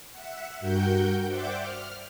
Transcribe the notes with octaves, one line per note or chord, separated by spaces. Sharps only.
E5 F#5
G2 F#4 A#4 F#5 G5 G6
C5 D5 E5 F#5 G5 D6
F6